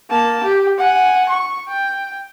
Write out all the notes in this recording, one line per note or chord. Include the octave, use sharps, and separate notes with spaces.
A#3 A5
G4
F#5 G#5
C#6
G5